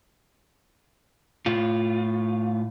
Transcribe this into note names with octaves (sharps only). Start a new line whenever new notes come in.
A2 F4